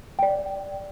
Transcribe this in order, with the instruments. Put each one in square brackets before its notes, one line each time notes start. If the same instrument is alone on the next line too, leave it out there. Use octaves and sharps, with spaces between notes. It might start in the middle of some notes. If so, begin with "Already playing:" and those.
[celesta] D5 G5